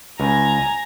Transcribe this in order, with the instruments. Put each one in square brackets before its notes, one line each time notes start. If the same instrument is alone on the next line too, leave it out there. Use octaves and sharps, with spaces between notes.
[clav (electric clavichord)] C#2 [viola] G#5 A#5